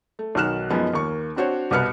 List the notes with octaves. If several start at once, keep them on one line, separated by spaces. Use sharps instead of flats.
A3
B1 D#3 F#4 F6 F#6 E7
F#2 F3 G#3 B3 C#4 D#4
D#2 A#3 C#6
C4 D4 F#4 C5 C#5
C2 B2 B4 F6 C#7